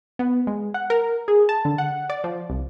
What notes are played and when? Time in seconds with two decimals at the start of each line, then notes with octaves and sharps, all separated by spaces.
0.19 B3
0.47 G#3
0.74 F#5
0.90 A#4
1.28 G#4
1.49 A5
1.65 D3
1.78 F#5
2.10 D5
2.24 F3
2.50 C2